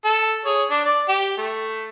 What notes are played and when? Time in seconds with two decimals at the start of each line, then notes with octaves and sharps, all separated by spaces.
0.04 A4
0.45 G#4 C#5
0.70 D4
0.85 D5
1.08 G4
1.38 A3